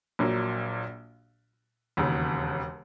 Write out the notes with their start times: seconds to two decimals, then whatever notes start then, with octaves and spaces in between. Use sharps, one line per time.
0.19 A#1 A#2 F#3 A#3
1.97 E1 D#2 C#3